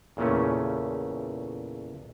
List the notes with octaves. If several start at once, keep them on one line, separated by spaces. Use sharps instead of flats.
E2 A#2 C#3 A3 C#4